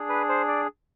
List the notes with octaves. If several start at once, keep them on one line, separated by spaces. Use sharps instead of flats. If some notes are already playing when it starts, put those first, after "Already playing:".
Already playing: D4 G#4
B4
C5
D5